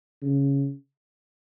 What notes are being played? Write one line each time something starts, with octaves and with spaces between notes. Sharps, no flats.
C#3